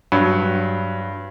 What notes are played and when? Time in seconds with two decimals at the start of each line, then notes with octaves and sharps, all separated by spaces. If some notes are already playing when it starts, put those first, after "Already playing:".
0.12 G2 F#3